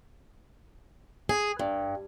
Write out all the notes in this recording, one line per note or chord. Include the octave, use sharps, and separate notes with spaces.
G#4
G2